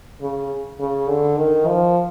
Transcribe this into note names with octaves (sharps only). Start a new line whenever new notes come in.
C#3
C#3
D3
D#3
F3